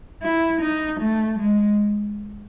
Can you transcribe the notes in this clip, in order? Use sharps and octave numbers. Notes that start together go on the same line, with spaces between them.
E4
D#4
A3
G#3